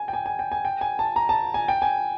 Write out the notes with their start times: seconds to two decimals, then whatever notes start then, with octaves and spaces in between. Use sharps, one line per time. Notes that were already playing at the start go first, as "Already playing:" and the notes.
Already playing: G#5
0.08 G5
0.13 G#5
0.26 G#5
0.39 G5
0.52 G#5
0.65 G5
0.81 G#5
0.99 A5
1.16 A#5
1.29 A5
1.54 G#5
1.68 G5
1.82 G#5